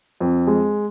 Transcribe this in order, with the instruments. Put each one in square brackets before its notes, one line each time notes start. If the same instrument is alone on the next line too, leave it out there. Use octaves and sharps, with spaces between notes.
[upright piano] F2
G#3